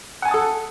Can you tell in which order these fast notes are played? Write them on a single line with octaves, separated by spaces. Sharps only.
F#5 G#5 A5 D#6 A4